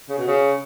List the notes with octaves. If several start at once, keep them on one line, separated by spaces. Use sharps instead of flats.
C#3
B2
C#3